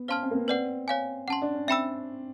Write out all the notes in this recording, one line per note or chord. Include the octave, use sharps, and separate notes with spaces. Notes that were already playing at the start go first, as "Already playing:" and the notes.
Already playing: B3
C#4 C5 F5 A5 C6 F6
C4
A#3
B3
C4 B4 D5 F#5
C#5 F5 G#5
C#4 F#5 A5 C6
D4
C#4
C4 E5 G5 B5 E6